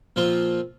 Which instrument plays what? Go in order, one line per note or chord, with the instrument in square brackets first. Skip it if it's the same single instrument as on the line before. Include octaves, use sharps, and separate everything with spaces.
[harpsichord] A#2 F3 C4 F4